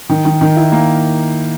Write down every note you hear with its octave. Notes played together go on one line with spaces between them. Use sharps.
D#3
D#3
D#3
E4
A#3